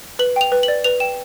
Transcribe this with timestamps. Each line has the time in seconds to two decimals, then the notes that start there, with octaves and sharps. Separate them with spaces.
0.19 B4 F#7
0.36 G5 F7
0.52 B4
0.63 F#7
0.68 D5
0.84 B4 F7
1.00 G5 E7